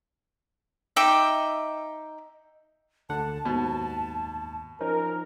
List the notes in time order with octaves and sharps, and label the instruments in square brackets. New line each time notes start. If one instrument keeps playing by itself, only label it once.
[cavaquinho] D#4 E5 G5 D6
[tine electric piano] D2 D3 F#5 [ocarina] A5
[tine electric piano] D#2 G#2 [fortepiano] B2
[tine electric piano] F3 C#4 D#4 [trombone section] A#4